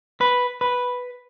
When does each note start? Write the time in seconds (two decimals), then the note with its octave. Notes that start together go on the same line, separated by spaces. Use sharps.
0.21 B4
0.61 B4